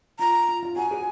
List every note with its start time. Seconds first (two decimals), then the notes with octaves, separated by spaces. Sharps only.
0.19 F4 A#5
0.48 F4
0.63 F4
0.76 F#4 G#5
0.91 G#4